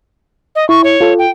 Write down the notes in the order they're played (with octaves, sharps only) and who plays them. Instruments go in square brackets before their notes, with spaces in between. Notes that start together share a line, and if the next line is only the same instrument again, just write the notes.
[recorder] D#5
[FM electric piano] E4 [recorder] C#6
[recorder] C#5
[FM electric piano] F4 A4
[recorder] G5